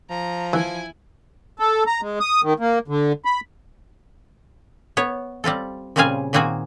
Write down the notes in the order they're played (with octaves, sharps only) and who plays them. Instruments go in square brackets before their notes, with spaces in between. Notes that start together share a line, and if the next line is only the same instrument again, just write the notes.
[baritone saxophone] F3 [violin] A#5
[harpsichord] E3 [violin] E4 G#5
[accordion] A4
A#5
G#3
D#6
D#3
A#3
D3
B5
[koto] B3 C#5
G3 C4 F4 A4
A#2 C#3 G3 C4 F5 G#5
A#2 D#3 A#3 C4 F#4 G#4